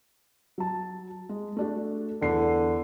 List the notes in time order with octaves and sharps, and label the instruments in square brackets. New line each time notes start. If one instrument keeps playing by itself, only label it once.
[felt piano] F#3 A5
G#3
A3 D4 F#4
[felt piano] E2 C7 [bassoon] D3